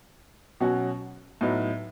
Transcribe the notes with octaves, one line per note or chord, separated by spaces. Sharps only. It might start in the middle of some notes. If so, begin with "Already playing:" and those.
B2 F#3 C#4 F#4
A2 F#3 B3 D#4